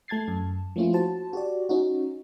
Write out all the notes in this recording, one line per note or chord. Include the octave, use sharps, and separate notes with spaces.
A3 A5 G#6 A6 C7
F#2 A5
F3 A3 A#3 C#4 E4 F4
F#4 C5 A5
F#4 G4 D5
C#4 D#4 F#4